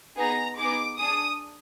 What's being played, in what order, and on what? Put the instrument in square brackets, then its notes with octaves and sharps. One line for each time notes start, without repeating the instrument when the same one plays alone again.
[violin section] B3 D#4 G#4 A#5
B3 D#4 G#4 D6
D4 G#4 D#6